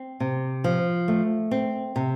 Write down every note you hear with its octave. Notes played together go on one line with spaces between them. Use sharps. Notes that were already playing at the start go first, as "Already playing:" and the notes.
Already playing: C4
C3
F3
A3
C4
C3